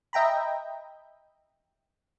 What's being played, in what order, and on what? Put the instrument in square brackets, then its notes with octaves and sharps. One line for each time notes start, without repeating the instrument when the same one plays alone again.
[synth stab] D#5 E5 G5 A#5 B5